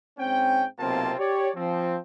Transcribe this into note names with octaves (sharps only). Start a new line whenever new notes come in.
G#2 C4 C#4 G5
B1 C3 A#3 C4 F4 A5
G4 C#5 D5
F3 C4